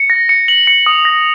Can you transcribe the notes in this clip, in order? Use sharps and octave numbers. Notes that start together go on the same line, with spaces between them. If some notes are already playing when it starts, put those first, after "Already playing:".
Already playing: C#7
A#6
C#7
F#7
C#7
D#6
A#6